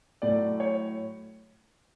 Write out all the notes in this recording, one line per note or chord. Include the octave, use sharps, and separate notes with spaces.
A2 F#3 A3 D5
C#5